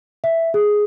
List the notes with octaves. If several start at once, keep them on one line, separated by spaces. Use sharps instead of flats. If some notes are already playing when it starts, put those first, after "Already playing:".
E5
G#4